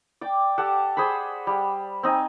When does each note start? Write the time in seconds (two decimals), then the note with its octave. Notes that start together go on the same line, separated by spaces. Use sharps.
0.21 D5 G5 D6
0.58 G4 A4 F#5 A5
0.97 G#4 C5 F#5 B5
1.47 G3
2.03 C4 D#4 G#5